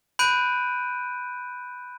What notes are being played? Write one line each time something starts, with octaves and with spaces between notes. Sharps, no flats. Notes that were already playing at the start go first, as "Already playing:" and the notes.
B5 F#6 G6 D7 D#7